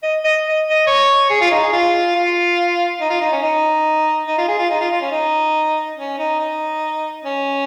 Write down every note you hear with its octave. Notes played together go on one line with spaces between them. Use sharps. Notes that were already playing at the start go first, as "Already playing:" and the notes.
D#5
D#5
D#5
D#5
C#5
G#4
F4
D#4
G#4
F4
F4
D#4
F4
D#4
C#4
D#4
D#4
F4
G#4
F4
D#4
F4
F4
C#4
D#4
C#4
D#4
D#4
C#4